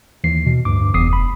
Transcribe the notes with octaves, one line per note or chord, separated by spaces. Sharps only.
D#2 E3 C7
B2
D2 G2 D6
G2
F1 E2 D#6 C7
B5